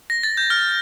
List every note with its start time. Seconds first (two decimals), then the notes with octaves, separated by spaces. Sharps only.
0.10 A#6
0.23 A6
0.37 G6
0.50 F6